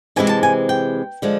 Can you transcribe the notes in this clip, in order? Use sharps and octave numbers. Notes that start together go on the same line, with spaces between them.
C3 E3 G#3 C4 E4 G#5
A5
G#5
G5
D3 F3 G#3